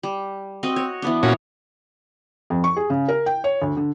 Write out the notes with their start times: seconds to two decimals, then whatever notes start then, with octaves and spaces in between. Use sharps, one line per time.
0.03 G3
0.63 C4 F#4 D#5
0.76 C#5
1.02 E3 B3 D4
1.23 A#2 C#4 F#4 C#5
2.50 F2
2.64 C#6
2.77 G#4
2.90 C#3
3.08 A#4
3.26 G5
3.44 C#5
3.62 D2
3.77 D3